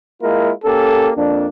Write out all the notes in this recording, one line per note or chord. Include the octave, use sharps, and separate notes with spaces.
G#3 A#3 E4 F4 A#4
A#3 C#4 G4 A4
F2 A#3 D4